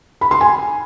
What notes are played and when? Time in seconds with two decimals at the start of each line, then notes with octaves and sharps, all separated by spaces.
0.21 B5
0.31 C6
0.41 G#5